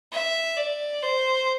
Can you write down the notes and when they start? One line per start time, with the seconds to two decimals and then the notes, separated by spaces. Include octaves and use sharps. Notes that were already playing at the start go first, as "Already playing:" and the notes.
0.12 E5
0.57 D5
1.03 C5